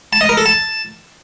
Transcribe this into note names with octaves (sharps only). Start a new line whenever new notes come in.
A5
D#5
A#4
A4
A5